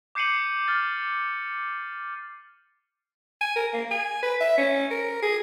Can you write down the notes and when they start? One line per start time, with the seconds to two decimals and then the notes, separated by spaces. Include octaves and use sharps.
0.15 D6 G6 C7 C#7 D#7 F#7
0.68 F6 A6
3.41 G#5
3.56 A#4
3.73 A#3
3.91 G#5
4.23 B4
4.41 E5
4.58 C#4
4.91 A#4
5.22 G#4